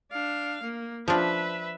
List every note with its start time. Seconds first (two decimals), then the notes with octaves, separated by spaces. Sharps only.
0.12 D4 F5
0.63 A#3
1.08 F3 D4 B4 E5